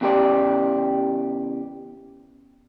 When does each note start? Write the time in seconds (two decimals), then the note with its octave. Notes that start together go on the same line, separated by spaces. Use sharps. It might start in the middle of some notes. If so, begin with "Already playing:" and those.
0.01 E2 C#3 G4 B4 D5